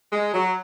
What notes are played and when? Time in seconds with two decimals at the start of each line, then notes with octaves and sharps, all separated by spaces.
0.12 G#3
0.34 F#3